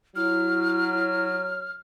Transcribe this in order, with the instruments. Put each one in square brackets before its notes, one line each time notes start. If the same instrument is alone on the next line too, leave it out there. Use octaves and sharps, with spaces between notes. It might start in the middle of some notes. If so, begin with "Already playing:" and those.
[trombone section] F#3 [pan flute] E4 [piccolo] F6